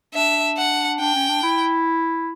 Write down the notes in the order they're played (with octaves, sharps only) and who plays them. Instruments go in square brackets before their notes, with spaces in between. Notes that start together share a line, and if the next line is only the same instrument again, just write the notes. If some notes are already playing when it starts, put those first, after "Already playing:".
[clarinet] D4 [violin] E5
[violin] F#5
[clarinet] D4 [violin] G5
[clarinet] C#4
D4
E4